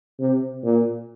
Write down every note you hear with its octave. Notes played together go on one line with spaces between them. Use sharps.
C3
A#2